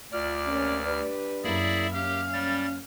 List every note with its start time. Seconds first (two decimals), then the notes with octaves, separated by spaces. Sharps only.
0.12 D2 F4 D5 F6
0.45 C3 A#3 C#4
0.85 G3 D4 B4
1.44 F#2 A#3 E4 G#4 D5 E5
1.94 C#4 G4 F5
2.33 G3 A6